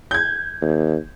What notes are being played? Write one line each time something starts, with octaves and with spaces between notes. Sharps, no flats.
G6 G#6
D#2